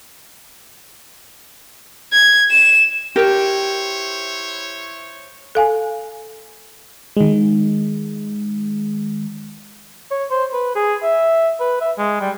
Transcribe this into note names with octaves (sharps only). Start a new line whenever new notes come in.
G#6
E7
E4 G4 A#4 C5 C#5
A4 F5 G#5
D#3 G#3
C#5
C5
B4
G#4
E5
B4
E5
G#3
G3